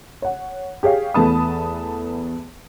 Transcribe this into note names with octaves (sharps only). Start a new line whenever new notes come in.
C#5 F#5
G4 G#4 C#5 F5
E2 A3 B3 A5 B5 D#6